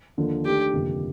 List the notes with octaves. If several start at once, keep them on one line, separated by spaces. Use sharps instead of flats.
D#2 D3 F3 A#3 D#4
D#3 A3 D4 G4
G1 F2 C3 D#3 A#3